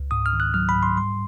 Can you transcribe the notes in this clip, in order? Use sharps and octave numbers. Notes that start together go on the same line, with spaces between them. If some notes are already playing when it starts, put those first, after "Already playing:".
Already playing: C#2
G#2 D#6
F6
D#3
F#6
F#3 F6
B5
G#2
C6
G3 C6